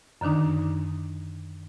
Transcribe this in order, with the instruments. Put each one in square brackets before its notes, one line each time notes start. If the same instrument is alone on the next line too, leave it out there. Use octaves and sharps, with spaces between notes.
[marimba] F#2 D3 D#3 D4 D#4